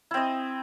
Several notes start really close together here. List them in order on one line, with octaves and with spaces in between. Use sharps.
E4 C4 D#5